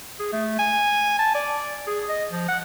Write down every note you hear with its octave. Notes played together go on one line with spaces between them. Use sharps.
G#4
A3
G#5
A5
D5
G#4
D#5
F3
F#5